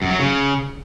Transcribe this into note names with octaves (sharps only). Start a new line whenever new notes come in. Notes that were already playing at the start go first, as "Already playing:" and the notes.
F#2
F#3
C#3